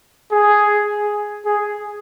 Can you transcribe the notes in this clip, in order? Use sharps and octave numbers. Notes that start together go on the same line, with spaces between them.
G#4
G#4